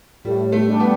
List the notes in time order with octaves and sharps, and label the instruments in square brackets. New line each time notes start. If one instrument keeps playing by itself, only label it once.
[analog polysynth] A2 [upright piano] G3
[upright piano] A3
[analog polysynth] G3 D4 G4
[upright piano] B3